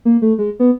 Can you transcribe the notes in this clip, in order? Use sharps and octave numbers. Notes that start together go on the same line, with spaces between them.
A#3
A3
G#3
B3